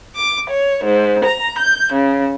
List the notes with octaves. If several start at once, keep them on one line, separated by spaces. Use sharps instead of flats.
D6
C#5
G#2
A#5
G6
C#3